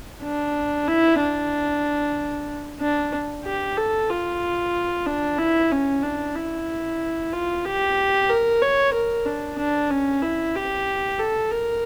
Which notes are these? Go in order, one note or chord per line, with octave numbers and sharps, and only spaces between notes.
D4
E4
D4
D4
G4
A4
F4
D4
E4
C#4
D4
E4
F4
G4
A#4
C#5
A#4
D4
D4
C#4
E4
G4
A4
A#4